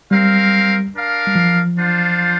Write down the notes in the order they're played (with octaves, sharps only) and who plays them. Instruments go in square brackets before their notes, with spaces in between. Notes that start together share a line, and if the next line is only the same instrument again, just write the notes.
[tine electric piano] G3 [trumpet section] C4 A#4 F5
[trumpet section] D4 A#4 F5
[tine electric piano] G3
F3
[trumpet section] D4 F4 C5 F5